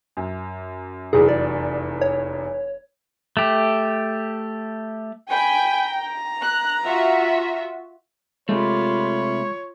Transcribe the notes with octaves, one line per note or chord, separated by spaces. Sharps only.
F#2
F1 E2 F#3 G#4
D5
C#5
A3 G4
G5 G#5 B5
A#5
F#6
F4 F#4 E5
C3 G#3 A3 F4 C#5 B5